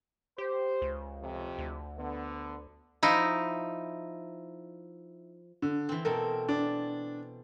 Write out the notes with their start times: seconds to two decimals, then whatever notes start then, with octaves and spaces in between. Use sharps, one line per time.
0.38 G4 C5
0.82 C#2
1.20 F2 C3
1.58 D2
1.99 D3 B3
3.03 F3 D#4 E4
5.62 D3
5.89 E3 C4
6.05 B2 C4 A4 A#4
6.49 D4